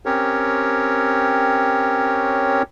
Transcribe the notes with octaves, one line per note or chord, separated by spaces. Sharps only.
C4 C#4 G4 A#4 C#5